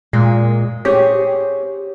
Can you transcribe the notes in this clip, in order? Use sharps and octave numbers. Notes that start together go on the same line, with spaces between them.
A#2 G#3
C4 G4 G#4 C#5